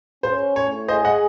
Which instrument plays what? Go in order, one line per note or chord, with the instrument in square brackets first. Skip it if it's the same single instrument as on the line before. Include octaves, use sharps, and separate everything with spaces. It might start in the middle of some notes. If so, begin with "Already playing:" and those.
[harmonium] C#4 [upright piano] C5
[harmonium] A2 [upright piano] C#5
[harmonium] G#4 [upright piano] C5 D#5
[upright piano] D#5 F#5